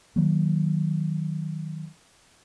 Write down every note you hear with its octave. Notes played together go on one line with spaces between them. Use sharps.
D#3 F#3 A#3